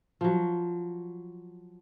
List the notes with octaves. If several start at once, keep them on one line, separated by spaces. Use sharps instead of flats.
F3 F#3